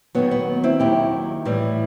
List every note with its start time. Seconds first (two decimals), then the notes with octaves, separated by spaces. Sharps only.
0.15 D#2 D#3 F#3 B3
0.31 B3
0.64 C4 E4
0.80 D#2 D#3 F#3 E4 G4
1.45 A2 E3 G3